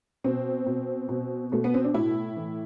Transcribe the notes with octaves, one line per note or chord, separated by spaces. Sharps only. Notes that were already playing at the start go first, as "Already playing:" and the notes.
B2 C4
B2
B2
B2 A3
B3
C4
D4
A2 E4
E3